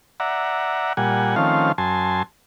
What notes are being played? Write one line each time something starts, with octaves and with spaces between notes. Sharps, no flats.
D5 E5 F#5 A#5
A#2 G3 F#5 G#5
D#3 F3 A3 C4 C#4 F5
F#2 G#5 A5 C6